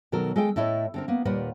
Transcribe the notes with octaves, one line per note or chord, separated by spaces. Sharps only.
B2 D#3 F#3 A4 A#4
G#3 A4 D#5 G5
A2 A3 E4 C#5 D#5
D3 C4 A#4
A#3 B3
D#2 A#2 G3 A#4 B4 F#5